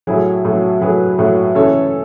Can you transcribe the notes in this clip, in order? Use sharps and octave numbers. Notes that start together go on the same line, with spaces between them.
A2 F#3 E4 G#4
A2 F#3
A2 F#3 G#4 B4
A2 F#3
C#3 E3 A4 C#5